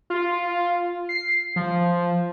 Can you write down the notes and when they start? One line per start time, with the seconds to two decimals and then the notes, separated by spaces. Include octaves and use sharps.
0.10 F4
1.09 C7
1.56 F3